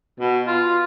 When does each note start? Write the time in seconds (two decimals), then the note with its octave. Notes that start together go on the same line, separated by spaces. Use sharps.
0.20 B2
0.47 F4